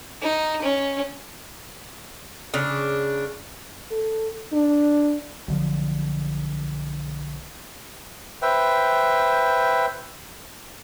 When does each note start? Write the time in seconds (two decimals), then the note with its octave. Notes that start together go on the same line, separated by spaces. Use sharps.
0.22 D#4
0.62 C#4
2.54 C#3 D4
3.91 A4
4.52 D4
5.48 B1 D3 F3
8.42 B4 C5 E5 G5